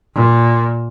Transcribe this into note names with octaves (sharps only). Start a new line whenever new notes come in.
A#2